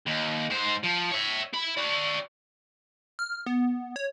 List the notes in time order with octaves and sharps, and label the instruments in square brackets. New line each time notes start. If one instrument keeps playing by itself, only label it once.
[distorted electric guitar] D#2
G#2 C5
F3
C#5 E5
E4 B5
F#4 D5
[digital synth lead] F6
B3
C#5